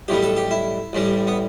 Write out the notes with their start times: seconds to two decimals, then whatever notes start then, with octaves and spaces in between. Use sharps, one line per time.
0.08 B1 A2 E3 G3 G4
0.22 A4
0.37 G4
0.51 E4
0.93 A1 A2 E3 G3
1.27 B3